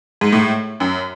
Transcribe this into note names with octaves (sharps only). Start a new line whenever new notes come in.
G#2
A2
F#2